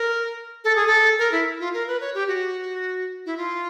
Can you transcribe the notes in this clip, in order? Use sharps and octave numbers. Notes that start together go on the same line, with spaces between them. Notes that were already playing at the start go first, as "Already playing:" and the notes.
Already playing: A#4
A4
G#4
A4
A#4
E4
F4
A#4
B4
C#5
G4
F#4
E4
F4